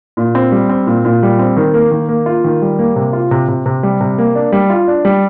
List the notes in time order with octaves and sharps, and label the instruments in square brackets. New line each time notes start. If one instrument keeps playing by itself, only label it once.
[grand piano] A#2
C4
G3
C4
A#2
A#2
G3
C4
D#3
A#3
D#3
A#3
F4
D#3
G3
A#3
C3
F4
C3
C3
C3
G3
C3
A#3
D4
G3
F4
D4
G3